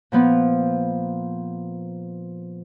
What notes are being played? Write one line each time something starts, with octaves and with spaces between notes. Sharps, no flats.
A#2 F3 B3